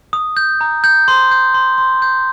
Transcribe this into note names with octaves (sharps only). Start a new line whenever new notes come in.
D#6
G6
A#5
G6
C6
G6
C6
C6
G6